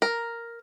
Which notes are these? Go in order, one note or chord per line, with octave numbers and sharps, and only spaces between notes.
A#4